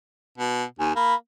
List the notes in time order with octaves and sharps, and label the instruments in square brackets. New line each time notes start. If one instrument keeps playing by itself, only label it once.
[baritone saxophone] B2
[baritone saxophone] D#2 [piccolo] G#5
[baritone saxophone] A#3 [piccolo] B5